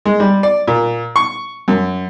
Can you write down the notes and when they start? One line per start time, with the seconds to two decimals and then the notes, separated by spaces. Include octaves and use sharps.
0.06 G#3
0.20 G3
0.43 D5
0.68 A#2
1.16 C#6
1.68 F#2